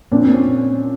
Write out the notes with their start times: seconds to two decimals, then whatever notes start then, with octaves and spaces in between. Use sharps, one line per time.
0.11 A#2 C4 D4
0.22 C4
0.27 A#2 C#4